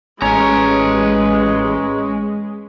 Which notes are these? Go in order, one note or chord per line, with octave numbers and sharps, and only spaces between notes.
A1 G#3 C#4 B4 A#5